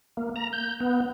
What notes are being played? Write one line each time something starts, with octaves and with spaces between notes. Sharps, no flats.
A#3
A#5
G6
B3